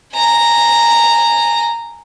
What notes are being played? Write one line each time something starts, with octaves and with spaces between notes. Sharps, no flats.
G#5 A#5